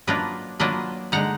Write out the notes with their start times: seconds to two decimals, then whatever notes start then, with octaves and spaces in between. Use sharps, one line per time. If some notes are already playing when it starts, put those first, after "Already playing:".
0.07 F#3 A#3 D4 F4 B4 D#5
0.60 F#3 A#3 D4 F4 B4 D#5
1.12 D3 G#3 D#4 F#5 A#5